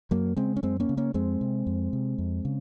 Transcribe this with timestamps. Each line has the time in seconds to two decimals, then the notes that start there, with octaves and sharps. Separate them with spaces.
0.11 F#2 F#3 A#3
0.36 C#3 G#3 C4
0.56 C#4
0.63 F#2 G#3 C4
0.80 A#3 C#4
0.89 C#3
0.97 A#3 C#4
1.14 F2 G#3 C4
1.41 C3
1.66 F2
1.93 C3
2.18 F2
2.45 C#3